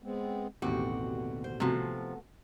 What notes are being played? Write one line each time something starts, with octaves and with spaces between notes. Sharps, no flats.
G#3 B3 C4
A1 D#2 B2 D3 C4 F#4 G4
C5
C3 F3 A3 B3 F#4